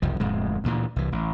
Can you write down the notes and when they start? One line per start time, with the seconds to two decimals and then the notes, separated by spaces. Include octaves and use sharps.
0.02 F#1 C2 F3
0.20 D1 F2 A2 G#3
0.64 D2 A#2 E3
0.96 C2 E3
1.12 A1